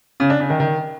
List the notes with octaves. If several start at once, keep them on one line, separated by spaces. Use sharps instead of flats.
C#3
D4
C#3
D#3
D#3